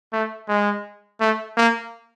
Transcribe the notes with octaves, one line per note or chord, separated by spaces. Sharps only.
A3
G#3
A3
A#3